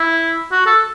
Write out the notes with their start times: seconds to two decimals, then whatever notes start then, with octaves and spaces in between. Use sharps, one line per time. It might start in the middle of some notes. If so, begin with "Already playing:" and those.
Already playing: E4
0.51 F#4
0.66 A4